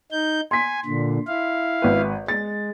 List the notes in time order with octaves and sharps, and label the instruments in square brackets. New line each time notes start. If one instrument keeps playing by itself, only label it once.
[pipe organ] D#4 G6
[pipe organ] G#5 [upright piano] C6 B6
[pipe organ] A#2 D3
E4 F5
[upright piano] G#1 B4
[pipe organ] G#3 [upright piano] A6